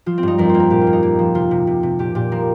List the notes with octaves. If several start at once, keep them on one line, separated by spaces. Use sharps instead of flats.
F3 F4
C4
G2 D#4
F2 A#4
C5
A#3
A#4
A#2 G4
F4
A#3
D#4
A#3
F3
C3 F4
C3
C3
C3
A#2 G4
A#2 G4
F3 A#4